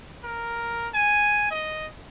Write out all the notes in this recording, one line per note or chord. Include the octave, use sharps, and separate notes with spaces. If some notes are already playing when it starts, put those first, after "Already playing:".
A#4
G#5
D#5